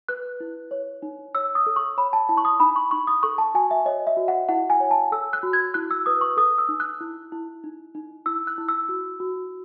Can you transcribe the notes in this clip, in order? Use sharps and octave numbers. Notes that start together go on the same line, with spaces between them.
B4 F#6
E4
C#5
D#4
C#5 E6
D#6
A4
C#6
C#5 B5
A5
E4 A5
C#6
D#6
D#4 B5
C#6
D#4 C#6
D#6
A4 C#6
A5
F#4 G#5
E5
C#5 D#5
E5
F#4
F#5
E4 F#5
G#5
C#5
A5
A4 E6
F#6
F#4
G#6
E4 F#6
E6
B4 D#6
C#6
A4 D#6
E6
D#4
F#6
E4
E4
D#4
D#4
E4 E6
F#6
E4
E6
F#4
F#4